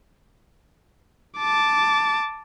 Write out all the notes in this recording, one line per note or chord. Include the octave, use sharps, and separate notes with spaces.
A5 D6